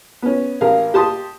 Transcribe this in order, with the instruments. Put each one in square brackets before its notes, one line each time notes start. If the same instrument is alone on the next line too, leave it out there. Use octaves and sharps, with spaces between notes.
[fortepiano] B3 C#4
A1 G#4 A#4 F5
G4 A5 C6 D#6